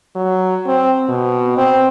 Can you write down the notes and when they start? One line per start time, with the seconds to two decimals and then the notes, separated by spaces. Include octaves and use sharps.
0.16 F#3
0.66 C4
1.09 B2
1.58 C4